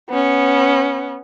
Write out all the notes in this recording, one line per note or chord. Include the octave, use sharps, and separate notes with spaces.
B3 C#4